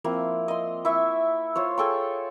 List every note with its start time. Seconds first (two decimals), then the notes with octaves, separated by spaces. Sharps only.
0.04 F3 A#3 C4 E4
0.48 D#5 C6
0.85 E4 E5 C#6
1.56 F4 C5 C#5
1.78 G#4 A4 G5 C#6